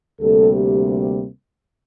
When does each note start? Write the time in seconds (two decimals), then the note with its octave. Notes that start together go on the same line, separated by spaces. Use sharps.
0.20 D2 C3 G3 A#3 A4
0.53 G4